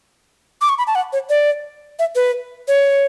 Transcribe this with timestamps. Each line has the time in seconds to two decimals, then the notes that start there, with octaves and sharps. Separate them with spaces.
0.61 D6
0.69 C#6
0.78 B5
0.87 A5
0.95 F#5
1.13 C#5
1.30 D5
1.99 E5
2.16 B4
2.68 C#5